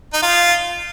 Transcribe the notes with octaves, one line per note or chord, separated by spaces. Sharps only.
D#4
F4